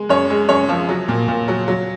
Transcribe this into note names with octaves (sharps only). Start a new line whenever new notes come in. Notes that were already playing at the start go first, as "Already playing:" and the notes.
Already playing: G#3
F#2 C#5
G#3
F#2 C#5
F3
F#3
A#2
A#2
F#3
F#3